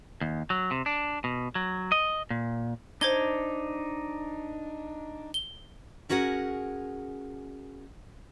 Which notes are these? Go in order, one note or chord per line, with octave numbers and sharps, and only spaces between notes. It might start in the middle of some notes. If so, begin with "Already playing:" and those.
D#2
F#3
C3
D4
B2
F#3
D#5
A#2
D4 D#4 C5 G#6 G7
G7
C#4 F#4 G#4 A#4 F#5